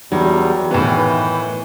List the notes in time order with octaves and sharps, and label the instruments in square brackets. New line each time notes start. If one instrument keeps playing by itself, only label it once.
[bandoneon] E2 G3 [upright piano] F#3
[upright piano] A2 D#3 B3 [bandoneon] E3